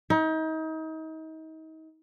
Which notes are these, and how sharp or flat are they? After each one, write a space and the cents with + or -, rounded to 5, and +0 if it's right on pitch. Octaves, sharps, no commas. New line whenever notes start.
D#4 +35